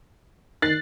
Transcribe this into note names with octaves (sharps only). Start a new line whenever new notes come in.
D#3 F#6 A6 C7